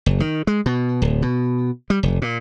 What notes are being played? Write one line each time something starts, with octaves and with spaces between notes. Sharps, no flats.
F#1
D#3
G#3
B2
D1
B2
G3
F1
A#2